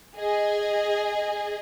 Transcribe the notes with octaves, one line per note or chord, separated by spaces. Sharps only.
G#4 D#5